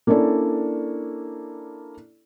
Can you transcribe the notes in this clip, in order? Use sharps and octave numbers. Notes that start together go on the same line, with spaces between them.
A#3 C#4 D4 E4 A4 D5